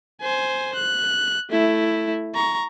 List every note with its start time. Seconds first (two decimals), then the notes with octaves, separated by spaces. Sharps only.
0.21 C5 G#5
0.75 F#6
1.50 A3 E4
2.34 A#5 C#6